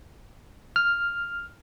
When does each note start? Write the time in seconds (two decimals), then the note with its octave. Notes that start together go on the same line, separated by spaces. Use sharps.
0.76 F6